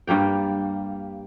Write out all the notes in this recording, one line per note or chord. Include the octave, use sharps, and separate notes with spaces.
G2 G3 A#3 G5